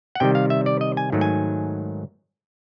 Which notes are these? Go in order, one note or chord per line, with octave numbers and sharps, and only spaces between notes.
F#5
C3 D#3 G3 G5
F5
E5
D5
D#5
G#5
G#2 D#3 F#3 A3
G#5